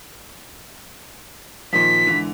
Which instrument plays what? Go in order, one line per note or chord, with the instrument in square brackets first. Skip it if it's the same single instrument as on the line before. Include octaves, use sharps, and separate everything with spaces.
[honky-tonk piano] A#2 D#3 F3 [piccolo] B6
[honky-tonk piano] G#2 D3 E3